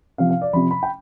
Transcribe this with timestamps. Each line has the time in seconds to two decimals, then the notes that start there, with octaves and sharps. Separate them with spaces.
0.18 C3 F3 F5
0.30 F5
0.42 D5
0.53 C3 F3 B5
0.71 B5
0.83 G5